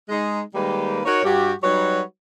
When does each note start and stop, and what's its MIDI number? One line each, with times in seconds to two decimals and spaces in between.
0.09 0.41 56
0.09 0.41 63
0.55 1.00 51
0.55 1.00 55
0.55 1.00 56
0.55 1.00 58
0.55 1.00 67
0.55 1.00 71
1.05 1.22 63
1.05 1.22 66
1.05 1.22 70
1.05 1.22 73
1.24 1.52 43
1.24 1.52 66
1.24 1.52 67
1.63 2.01 54
1.63 2.01 55
1.63 2.01 63
1.63 2.01 66
1.63 2.01 71
1.63 2.01 73